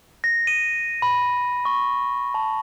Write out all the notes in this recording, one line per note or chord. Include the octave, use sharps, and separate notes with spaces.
A#6
D#7
B5
C#6
A5